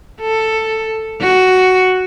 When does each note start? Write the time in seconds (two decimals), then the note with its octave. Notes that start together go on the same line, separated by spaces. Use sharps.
0.21 A4
1.21 F#4